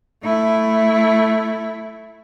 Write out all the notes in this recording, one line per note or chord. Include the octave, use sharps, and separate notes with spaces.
A3 E4